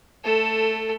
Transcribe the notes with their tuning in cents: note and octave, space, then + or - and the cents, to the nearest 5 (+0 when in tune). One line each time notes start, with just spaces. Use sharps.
A3 +0 A4 +15